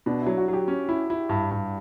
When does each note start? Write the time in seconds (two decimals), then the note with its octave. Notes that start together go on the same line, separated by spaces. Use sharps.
0.06 B2 D4
0.22 F#3 E4
0.37 F#4
0.48 F#3 G4
0.68 C#4
0.89 E4
1.10 E4
1.29 G2
1.51 G2